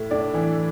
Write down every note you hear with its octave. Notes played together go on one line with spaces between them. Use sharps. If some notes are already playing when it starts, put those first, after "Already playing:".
Already playing: A2 A3 E4 E5
A2 D4 D5
E3